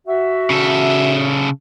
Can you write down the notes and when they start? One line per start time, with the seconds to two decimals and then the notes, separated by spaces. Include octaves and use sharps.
0.07 F#4 E5
0.50 C#3 A4